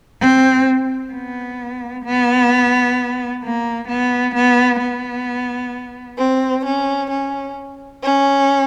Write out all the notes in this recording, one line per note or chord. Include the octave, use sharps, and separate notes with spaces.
C4
B3
B3
A#3
B3
B3
B3
C4
C#4
C#4
C#4